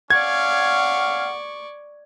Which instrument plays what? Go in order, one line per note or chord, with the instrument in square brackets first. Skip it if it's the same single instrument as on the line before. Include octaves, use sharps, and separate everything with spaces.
[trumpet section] C#4 F5 [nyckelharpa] D5 C#6 [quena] F#5 [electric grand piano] G#6